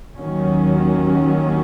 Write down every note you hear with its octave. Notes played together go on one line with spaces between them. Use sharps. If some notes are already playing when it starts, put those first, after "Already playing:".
D#2 D#3 F#3 C#4